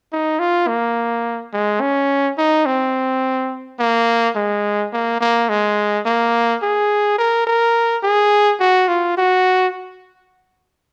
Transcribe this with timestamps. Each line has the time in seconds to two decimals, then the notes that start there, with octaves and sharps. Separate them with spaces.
0.13 D#4
0.40 F4
0.68 A#3
1.53 G#3
1.81 C#4
2.38 D#4
2.66 C4
3.80 A#3
4.36 G#3
4.93 A#3
5.21 A#3
5.49 G#3
6.06 A#3
6.63 G#4
7.18 A#4
7.47 A#4
8.03 G#4
8.60 F#4
8.88 F4
9.17 F#4